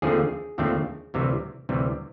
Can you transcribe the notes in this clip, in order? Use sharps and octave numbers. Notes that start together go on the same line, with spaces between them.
D#2 D3 F3 A3 C4 G#4
D#2 D3 F3 A3 C4
D2 C3 E3 G3
D2 C3 E3 G3